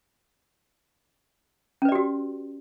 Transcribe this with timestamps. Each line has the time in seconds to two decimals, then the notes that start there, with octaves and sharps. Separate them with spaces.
1.82 C#4
1.85 B4
1.89 D5
1.92 G4
1.95 F#4